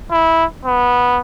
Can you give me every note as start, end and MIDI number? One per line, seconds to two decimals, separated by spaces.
0.11 0.45 64
0.65 1.19 59